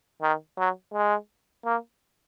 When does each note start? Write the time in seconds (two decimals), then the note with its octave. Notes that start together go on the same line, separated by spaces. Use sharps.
0.22 D#3
0.58 F#3
0.93 G#3
1.65 A#3